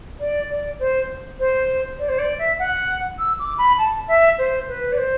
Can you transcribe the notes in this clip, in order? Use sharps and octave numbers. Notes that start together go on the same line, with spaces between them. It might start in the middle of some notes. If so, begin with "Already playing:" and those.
D5
D5
C5
C5
D5
C5
D5
E5
F#5
E6
D6
B5
A5
E5
C5
B4
D5
C5